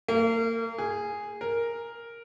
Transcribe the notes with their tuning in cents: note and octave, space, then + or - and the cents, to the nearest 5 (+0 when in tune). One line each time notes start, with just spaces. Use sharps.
A#3 -35
G#4 -5
A#4 +0